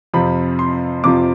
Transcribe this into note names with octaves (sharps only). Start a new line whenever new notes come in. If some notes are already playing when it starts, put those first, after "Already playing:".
F2 C3 F3 B5
C6
F2 C3 F3 D6